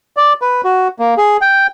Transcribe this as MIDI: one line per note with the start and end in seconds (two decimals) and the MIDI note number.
0.17 0.33 74
0.42 0.61 71
0.64 0.88 66
0.99 1.14 58
1.18 1.37 68
1.41 1.67 79